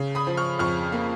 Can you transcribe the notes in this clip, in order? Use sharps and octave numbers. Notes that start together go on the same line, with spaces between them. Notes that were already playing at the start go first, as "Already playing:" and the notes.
Already playing: C#3
B5 D#6
F3
C#6 F6
F2 C#6 F6
A#3